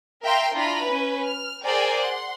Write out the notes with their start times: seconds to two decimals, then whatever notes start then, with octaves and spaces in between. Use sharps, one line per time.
0.23 A#4 E5 F5 G5 A#5 C6
0.53 D4 E4 F4 A#5 B5
0.84 C#4 B4
1.24 F6
1.63 G#4 A#4 C5 D5 G5 G#5
2.02 F#5 C6